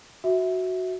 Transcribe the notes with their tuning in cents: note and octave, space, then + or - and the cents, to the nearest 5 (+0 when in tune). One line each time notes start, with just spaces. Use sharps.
F#4 +0 E5 -15